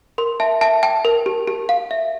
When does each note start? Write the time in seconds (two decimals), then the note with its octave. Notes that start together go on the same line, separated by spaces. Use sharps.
0.18 A#4 C6
0.40 E5 A5
0.61 E5 A5
0.83 G5 A5
1.05 A#4
1.26 G4
1.48 G4
1.69 F5
1.91 E5